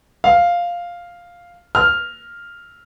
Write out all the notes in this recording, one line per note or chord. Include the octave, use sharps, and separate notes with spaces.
F5
F6